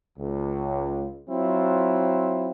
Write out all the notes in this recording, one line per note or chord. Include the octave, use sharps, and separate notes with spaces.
C#2
F#3 C4 E4 F4